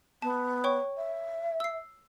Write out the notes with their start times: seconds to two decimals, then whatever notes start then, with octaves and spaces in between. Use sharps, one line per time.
0.22 B3 A5
0.64 C#5 G5 C#6
0.97 E5
1.60 E6 C7